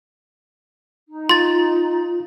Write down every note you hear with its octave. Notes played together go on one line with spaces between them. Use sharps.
D#4
F4 C6 A6